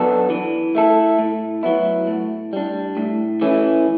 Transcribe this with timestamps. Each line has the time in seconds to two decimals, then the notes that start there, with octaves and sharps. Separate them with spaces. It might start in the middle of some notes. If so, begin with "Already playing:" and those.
Already playing: F#3 B3 D4 A4
0.30 E3
0.75 A3 E4 A4
1.19 A2
1.63 F#3 B3 E4
2.07 A2
2.53 G3 D4
2.97 A2
3.41 E3 A3 C#4